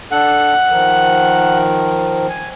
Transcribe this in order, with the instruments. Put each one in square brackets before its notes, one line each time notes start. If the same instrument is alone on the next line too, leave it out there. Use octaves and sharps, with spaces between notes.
[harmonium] D4 A4 [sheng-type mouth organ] F#5
[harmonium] D#3 F3 A#4
G#5